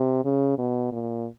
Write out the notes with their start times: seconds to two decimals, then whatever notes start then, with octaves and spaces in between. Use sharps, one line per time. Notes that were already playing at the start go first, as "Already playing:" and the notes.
Already playing: C3
0.25 C#3
0.58 B2
0.92 A#2